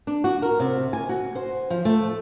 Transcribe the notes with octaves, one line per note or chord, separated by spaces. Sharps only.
D4
F#4
A#4
C3
G#5
F#4
C5
F3
A3